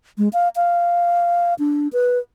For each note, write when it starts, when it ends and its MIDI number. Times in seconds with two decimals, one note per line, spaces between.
0.18 0.29 56
0.33 0.49 77
0.56 1.54 77
1.59 1.88 62
1.93 2.19 71